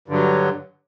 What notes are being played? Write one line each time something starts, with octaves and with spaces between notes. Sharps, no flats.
G2 D3 F#3